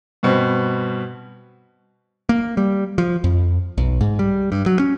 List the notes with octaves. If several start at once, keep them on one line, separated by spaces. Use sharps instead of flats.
G2 B2 C4
A#3
G3
F3
F2
B1
G#2
G3
G2
F#3
C#4